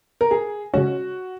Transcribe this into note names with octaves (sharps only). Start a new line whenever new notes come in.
A#4
G#4
C#3 G#3 C#4 F#4